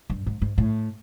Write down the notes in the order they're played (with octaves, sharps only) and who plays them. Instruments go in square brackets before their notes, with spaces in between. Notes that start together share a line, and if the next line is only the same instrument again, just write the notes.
[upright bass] G2
G#2
G#2
A2